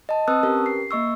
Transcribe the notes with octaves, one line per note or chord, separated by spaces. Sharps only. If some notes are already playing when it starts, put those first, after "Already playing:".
D#5 A5
C4 B4 A5 D#6 E6 F#6
C#4 G4 A#4 B4
C7
A#3 D#5 C#6 E6